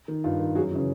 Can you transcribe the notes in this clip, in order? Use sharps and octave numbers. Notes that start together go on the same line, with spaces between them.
D#3
G2 D#4 F4
D#3
F#2 F#4 G#4
C#3 E3